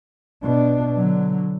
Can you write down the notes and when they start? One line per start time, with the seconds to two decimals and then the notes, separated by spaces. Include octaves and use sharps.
0.43 B2 D4
0.97 D3 F#3